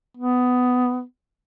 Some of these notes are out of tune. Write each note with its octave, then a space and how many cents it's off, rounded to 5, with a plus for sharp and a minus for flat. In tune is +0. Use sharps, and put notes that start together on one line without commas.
B3 +15